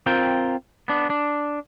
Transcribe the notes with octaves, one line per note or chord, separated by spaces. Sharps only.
C4 F4 A#4 G5
B3 D4
D4